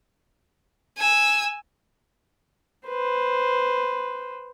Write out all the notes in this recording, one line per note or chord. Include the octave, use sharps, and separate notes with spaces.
G#5 E6
B4 C5